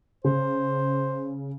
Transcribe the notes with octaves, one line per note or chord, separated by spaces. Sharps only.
C#3 C5